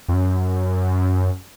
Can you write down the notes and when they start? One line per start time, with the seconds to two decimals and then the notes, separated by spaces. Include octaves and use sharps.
0.08 F2
0.13 F#2